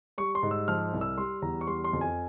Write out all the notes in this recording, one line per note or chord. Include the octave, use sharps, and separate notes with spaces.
G3 C#6
C6
G#2
E6
F3 F6
C2
E6
G3 C6
E2 A#5
C#6
G3 C6
C6
F2
G#5